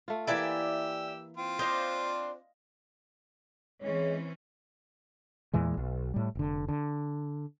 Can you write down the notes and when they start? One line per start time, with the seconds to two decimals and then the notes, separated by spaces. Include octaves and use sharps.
0.08 A3 F4
0.27 E3 A#3 E4 G4 D5 E5 G#5 E6
1.37 C4 F4
1.59 D4 C5 D#5 F5
3.82 E3 G#3 C4 C#4 C#5
5.54 E2 A#2 E3 G#3
5.77 B1
6.14 A2 G3
6.35 F1 D3
6.68 D3